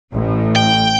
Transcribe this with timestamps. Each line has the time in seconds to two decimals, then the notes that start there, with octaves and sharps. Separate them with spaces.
0.13 A1 A2
0.56 G5